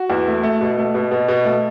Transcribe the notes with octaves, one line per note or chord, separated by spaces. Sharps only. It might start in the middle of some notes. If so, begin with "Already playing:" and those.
Already playing: F#4
E2
A3
A3
B2
A3
B2
B2
B2
A3